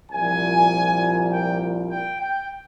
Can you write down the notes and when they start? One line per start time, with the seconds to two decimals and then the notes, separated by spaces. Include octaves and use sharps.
0.11 C2 A#2 F3 G#5
1.30 G5
1.90 G5
2.20 G5